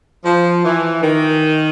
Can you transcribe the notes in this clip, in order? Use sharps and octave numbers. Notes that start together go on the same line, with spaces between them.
F3
E3
D#3